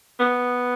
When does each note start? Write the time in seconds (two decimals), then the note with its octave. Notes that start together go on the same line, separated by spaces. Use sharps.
0.20 B3